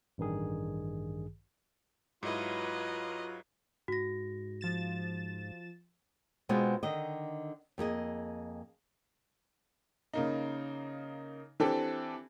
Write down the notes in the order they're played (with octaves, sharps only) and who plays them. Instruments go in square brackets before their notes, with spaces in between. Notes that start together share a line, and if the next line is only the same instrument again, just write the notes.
[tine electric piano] A1 G2 D#3 G#4
[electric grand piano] G#2 E4 [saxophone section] F#3 F4 [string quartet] B4 D#5 A#5
[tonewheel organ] G#2 [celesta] F#4 A#6
[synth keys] F3 A6 E7
[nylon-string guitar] B2 G#3 B3 C4 F4
D3 D#3 D#5
F2 A#3 G#4 D#5
[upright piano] C#3 A#3 D#4
E3 C4 D4 G4 A4